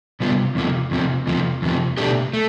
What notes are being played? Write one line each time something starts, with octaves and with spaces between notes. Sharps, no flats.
C3 G3 B3 F4
E2 C3 F3
E2 C3 F3
E2 C3 F3
E2 C3 F3
B2 A3 D4 G4
A3